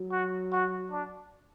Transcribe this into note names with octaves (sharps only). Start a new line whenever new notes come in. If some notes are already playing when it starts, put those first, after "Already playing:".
Already playing: F#3
F#4
F#4
D4